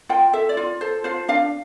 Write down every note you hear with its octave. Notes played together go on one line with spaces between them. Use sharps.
F4 G5
A4 E5
D5
F4
A4 C5
F4 C5
D4 F5